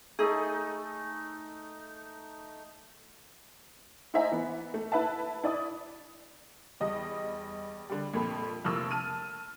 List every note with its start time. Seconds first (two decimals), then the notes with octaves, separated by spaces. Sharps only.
0.19 A3 D#4 G#4
4.14 E4 C5 D#5 E5 G#5 A#5
4.32 E3 B3
4.74 A3
4.92 E4 B4 E5 A5
5.44 E4 D5 D#6
6.80 E2 G3 D#5
7.89 D3 G3
8.14 F2 A#2 A3 B5
8.64 F1 F3 A#3 C#6 E6
8.91 A5 F6 D#7